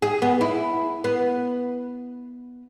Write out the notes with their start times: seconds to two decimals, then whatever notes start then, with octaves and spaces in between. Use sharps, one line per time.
0.02 G#4
0.22 B3
0.41 E4
1.04 B3